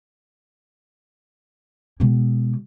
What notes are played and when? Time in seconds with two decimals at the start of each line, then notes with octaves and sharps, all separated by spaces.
2.00 B2 G#3